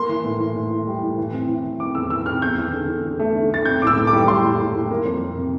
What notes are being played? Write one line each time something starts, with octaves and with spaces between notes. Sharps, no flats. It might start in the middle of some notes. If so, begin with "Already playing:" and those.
Already playing: A#3 C6
E3
A2
E3
A2
E3
G3
A2
E3
C4
E3
E3
C4 D6
E2 E6
E2 E6
C4 F6
E2 G6
E2
D3
D3
E2
A3
D3
A3 A6
C4 G6
A2 D6 E6
A2
D6
G3
G3 C6
A2
A2
A2
A#3
F2
A#3
C3